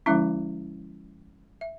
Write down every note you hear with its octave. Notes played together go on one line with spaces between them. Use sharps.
D3 F3 G#3 C#4 E4 E5
E5